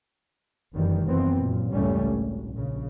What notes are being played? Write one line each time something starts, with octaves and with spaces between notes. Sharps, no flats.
F1 F#2 D#3 E3 G3
F#2 E3 B3 C4
F#2 A#2
F#1 C#2 A2 G3 A3 C#4
G#1
A#1 C#3